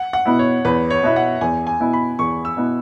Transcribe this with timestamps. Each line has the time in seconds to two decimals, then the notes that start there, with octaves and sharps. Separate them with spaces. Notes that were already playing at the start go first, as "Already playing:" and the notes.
Already playing: F#5
0.13 F#5
0.25 B2 B3 E4
0.39 C#5
0.65 E2 B4
0.90 C#5
1.03 B2 B3 E4 E5
1.16 F#5
1.41 E2 G#5
1.67 G#5
1.80 B2 B3 E4
1.93 B5
2.19 E2 C#6
2.45 E6
2.57 B2 B3 E4